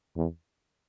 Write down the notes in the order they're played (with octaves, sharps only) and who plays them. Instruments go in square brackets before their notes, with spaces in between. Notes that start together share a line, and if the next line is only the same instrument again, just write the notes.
[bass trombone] E2